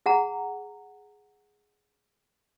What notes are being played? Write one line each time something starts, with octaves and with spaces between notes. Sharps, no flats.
G#4 F#5 A#5